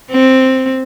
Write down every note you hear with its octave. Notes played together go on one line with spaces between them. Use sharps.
C4